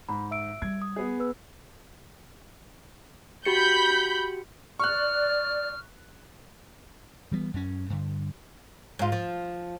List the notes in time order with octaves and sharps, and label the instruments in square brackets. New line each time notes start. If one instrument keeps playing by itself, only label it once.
[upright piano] G#2 [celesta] B5
[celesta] E5 E6 D7
[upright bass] G3 [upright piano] G#6
[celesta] D#6
[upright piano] B3 G#4
[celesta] B4 E6
[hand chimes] F#4 G4 C#7 [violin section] B5 G6
[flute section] D5 [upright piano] C#6 F#6 [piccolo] F6
[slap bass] E3 G3 G#3 B3
F#2 C#4
G2 D3
[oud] G#2 F4
F3